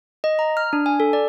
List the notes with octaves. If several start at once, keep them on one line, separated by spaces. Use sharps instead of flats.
D#5
A#5
F6
D4
G#5
A4
D5